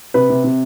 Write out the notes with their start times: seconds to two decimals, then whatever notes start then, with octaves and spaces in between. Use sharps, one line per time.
0.14 C3 B4
0.30 C3
0.44 C3